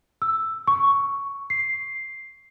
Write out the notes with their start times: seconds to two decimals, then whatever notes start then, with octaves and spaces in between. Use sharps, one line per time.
0.22 E6
0.67 C#6
1.50 C7